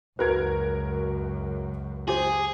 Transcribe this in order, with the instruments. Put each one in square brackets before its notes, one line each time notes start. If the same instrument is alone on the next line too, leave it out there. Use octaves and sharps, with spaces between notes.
[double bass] C#2 F#2 [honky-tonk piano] F#4 A#4 G#6 [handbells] B4
[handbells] F4 G4 C5 [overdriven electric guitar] G#4